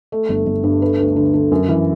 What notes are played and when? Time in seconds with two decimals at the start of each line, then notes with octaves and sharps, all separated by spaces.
0.12 A3
0.29 G1
0.46 G1
0.64 G2
0.82 A3 B4
0.99 D2
1.16 D3
1.34 D3
1.52 F#2
1.69 E3